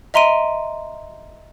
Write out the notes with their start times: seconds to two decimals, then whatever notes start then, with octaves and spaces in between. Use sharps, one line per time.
0.14 D#5 E5 A#5 C6 D7 D#7